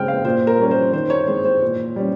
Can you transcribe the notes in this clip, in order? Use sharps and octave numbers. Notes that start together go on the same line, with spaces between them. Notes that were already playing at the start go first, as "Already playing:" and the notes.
Already playing: C#3 G#3 C4 G5 F6
F5
A#2 C5
A#4
G3 C#4
C5
D#3 C5
C#5
G#3 C4 C5
C5
A#2
G3 C#4